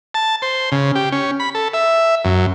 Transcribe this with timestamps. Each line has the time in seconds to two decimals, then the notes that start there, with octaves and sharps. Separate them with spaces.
0.14 A5
0.42 C5
0.72 C#3
0.95 G4
1.12 C#4
1.40 B5
1.55 A4
1.74 E5
2.25 F#2